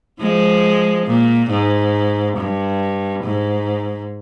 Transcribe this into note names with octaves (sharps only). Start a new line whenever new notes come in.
F3 G#3
A#2
G#2
G2
G#2